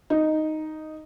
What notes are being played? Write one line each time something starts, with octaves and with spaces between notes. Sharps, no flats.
D#4